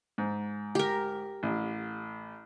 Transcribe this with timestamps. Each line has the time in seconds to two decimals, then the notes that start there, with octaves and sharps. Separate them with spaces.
0.18 G#2
0.75 G4 A#4
1.43 A1